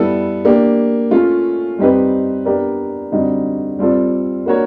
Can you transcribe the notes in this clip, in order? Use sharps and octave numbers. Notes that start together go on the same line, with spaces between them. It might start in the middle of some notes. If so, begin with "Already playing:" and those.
Already playing: G3 B3 E4 A4
A#3 D4 G4
A3 C#4 F4
G3 C4 D#4 G4 B4
B3 D4 G4 A#4 D5
D3 G3 C4 D#4 F#4
G3 C4 F4 A4 D5
A#3 D4 F#4 A#4 C#5